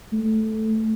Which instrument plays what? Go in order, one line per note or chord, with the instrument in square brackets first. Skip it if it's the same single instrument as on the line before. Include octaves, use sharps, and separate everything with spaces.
[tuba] A3